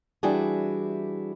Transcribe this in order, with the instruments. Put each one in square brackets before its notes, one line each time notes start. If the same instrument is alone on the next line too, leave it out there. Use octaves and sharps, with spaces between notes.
[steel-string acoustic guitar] E3 G3 D4 E4 F#4 G#4